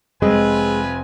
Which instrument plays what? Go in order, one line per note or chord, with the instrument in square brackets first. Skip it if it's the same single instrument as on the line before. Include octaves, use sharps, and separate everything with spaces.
[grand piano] F1 C4 D#5 [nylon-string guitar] G#3 [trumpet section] F4 B4 G#5